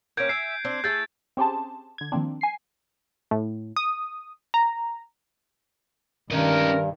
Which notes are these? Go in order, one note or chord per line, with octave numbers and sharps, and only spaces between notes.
A#3 C4 C#4 G6 G#6 D7
E5 G#5 C7
C4 D4
A3 E4 G#4 G6 A6
C4 C#4 G4 G#4 C5 A5
D3 G#6
D#3 F3 A#3 C4 D4
G#5 C7
A2
D#6
A#5
G2 D#3 C#4 A#4 D#5